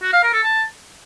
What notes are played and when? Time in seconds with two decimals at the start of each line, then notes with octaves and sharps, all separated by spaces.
0.03 F#4
0.13 F5
0.23 A#4
0.33 A4
0.43 A5